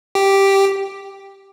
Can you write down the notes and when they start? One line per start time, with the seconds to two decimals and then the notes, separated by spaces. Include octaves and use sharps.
0.15 G4